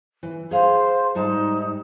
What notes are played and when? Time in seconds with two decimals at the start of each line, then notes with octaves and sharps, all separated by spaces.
0.23 E3
0.51 G#4 C5 F5
1.15 G#2 G3 D#4 A5